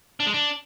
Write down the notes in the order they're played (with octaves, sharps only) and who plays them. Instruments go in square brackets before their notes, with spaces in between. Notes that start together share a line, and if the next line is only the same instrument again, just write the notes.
[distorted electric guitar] D4
G#3
D4